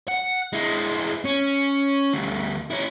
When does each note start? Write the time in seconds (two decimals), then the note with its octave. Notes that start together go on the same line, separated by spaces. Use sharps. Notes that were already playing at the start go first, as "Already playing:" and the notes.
0.08 F#5
0.53 G#3 E4
1.25 C#4
2.14 D2 G2
2.70 C#4 E4